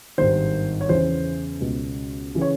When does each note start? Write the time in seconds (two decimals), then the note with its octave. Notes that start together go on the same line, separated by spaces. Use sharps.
0.18 G#1 G2 D#3 C5
0.81 C#5
0.89 E2 C#3 E3 C5
1.61 C#2 B2
2.35 C#3 E3
2.41 C#5